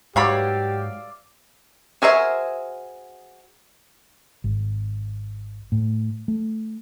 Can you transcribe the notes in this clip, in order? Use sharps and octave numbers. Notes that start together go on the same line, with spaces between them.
G#2 F#3 G4 C#5 D5 E5 F5 B5
F#4 G#4 A#4 C5 E5
G#1
A2
A3